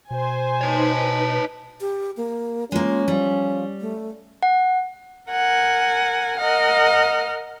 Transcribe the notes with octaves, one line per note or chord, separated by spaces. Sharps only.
B2 C5 G#5
D#4 B4 C#5 A5 B5
G4
A#3
G#3 A#3 C#4 F4
F3 G3
A3
F#5
A#4 F#5 G#5
A#4 D#5 F#5 F6